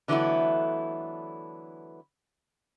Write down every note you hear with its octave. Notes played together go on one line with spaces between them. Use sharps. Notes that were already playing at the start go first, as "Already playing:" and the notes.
D3 E3 F#3 A3 B3 E4